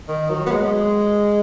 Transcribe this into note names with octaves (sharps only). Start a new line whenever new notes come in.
D#3
F#3
B3
G#3